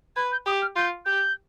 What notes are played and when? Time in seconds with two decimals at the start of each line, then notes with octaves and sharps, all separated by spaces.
0.16 B4 G#6
0.31 G6
0.46 G4 D#6
0.61 F6
0.76 F4 G6
1.05 G4 G6